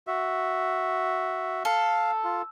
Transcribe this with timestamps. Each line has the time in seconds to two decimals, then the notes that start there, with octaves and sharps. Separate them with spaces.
0.07 F#4 E5
1.65 A4 F5
2.24 F4